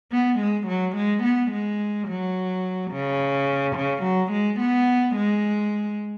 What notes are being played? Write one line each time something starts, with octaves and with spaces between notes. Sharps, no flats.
B3
G#3
F#3
G#3
B3
G#3
F#3
C#3
C#3
F#3
G#3
B3
G#3